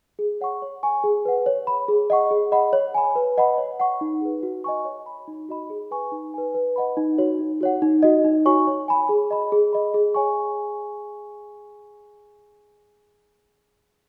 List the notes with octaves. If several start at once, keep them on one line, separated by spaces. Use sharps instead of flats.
G#4
C#5 F#5 C#6
C#5
G#5 C#6
G#4
B4 F#5
C#5
B5
G#4
D#5 F#5 C#6
G#4
D#5 F#5 B5
C#5
G#5 B5
B4
D#5 F#5 B5
C#5
F#5 C#6
D#4
G#4 B4
F#4
D#5 G#5 C#6
C#5
B5
D#4
F#4 D#5 B5
G#4
B4 G#5 C#6
D#4
B4 G#5
B4
D#5 F#5 B5
D#4
F#4 C#5
D#4
F#4 C#5 F#5
D#4
F#4 D#5
D#4
F#4 C#5 G#5 C#6
C#5
G#5 B5
G#4
D#5 B5
G#4
D#5 B5
G#4
C#5 G#5 C#6